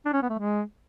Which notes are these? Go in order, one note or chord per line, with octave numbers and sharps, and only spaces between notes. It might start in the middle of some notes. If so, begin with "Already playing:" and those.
D4
C#4
B3
A3
G#3